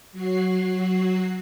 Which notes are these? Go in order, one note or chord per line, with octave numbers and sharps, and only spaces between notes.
F#3 F#4 C7